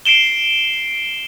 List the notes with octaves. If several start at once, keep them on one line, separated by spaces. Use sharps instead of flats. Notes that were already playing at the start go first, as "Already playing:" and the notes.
C7 D7 E7 G7